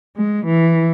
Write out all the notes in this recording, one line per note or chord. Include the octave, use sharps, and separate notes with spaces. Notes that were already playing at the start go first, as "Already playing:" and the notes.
G#3
E3